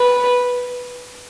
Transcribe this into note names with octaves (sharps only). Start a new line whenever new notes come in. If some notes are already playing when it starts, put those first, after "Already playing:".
Already playing: B4